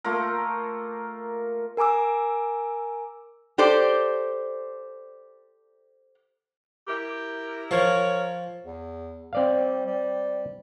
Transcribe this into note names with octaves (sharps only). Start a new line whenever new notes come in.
A3 A#3 F4 A#4
A#4 G#5 A#5 D6 E6
G4 A4 C5 D5
E4 G4 A#4
F3 A#4 C#5
E2
G3 C4 D5 F5
G3